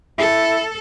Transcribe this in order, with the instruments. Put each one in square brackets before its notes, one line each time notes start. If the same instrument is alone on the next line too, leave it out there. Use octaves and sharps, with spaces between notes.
[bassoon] E4 [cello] A4